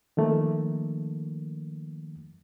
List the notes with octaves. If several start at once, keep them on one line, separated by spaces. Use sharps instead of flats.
D#3 F3 A3 A#3